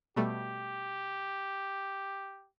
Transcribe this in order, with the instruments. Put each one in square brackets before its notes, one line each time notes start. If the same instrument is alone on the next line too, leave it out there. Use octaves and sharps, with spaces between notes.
[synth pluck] B2 G3 A3 [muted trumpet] G4